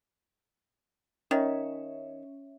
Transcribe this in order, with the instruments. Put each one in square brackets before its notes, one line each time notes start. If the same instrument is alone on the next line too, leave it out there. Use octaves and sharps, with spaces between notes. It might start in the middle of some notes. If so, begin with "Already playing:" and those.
[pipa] D#3 [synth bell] C#4 C#5 E5